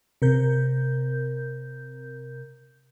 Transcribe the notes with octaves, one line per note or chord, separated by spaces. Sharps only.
C3 A#4 G6